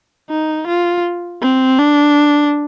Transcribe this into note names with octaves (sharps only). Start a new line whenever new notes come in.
D#4
F4
C4
D4